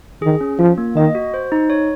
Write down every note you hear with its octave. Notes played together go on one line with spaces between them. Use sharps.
D#3 G#4
C#4
F3 F4
A#3
D#3 D#5
F#4
C5
D#4
C#5